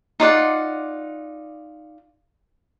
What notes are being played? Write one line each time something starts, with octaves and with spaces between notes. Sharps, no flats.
D#4 F4 D5 F#5